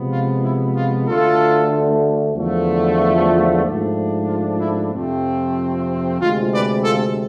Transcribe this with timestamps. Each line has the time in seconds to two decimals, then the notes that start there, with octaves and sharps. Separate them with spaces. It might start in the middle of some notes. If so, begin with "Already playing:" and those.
Already playing: C3 F3 G#3 B3
0.12 F4
0.44 E4
0.76 F4
1.08 D2 D3 A3 D4 F4 A4
2.36 E2 D3 F3 A3
3.01 F4
3.64 G#2 F3 A3 D4
4.28 F4
4.61 E4
4.93 F2 C3 F3 A3 C4
6.21 D2 C3 G#3 F4
6.53 B4 D5
6.84 F4 A4